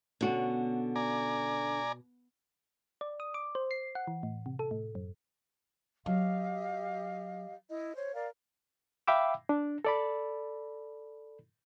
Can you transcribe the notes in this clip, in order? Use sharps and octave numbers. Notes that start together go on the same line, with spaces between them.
B2 D3 C#4 F#4
D5 G#5 A#5
D5
D#6
D6
C5
C7
F#5
E3
A2
C3
A4
A2
F#2
F#3 G4 D#5 F5
E4 D#5
C5 C#5
A#4 D5 F5
E5 F5 G5 B5 D6 E6
D4
A4 D5 B5